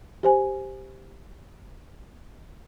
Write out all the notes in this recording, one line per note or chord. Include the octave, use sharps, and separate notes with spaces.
G4 C5 G#5